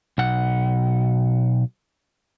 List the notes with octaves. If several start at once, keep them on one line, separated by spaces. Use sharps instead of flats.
B1 F#5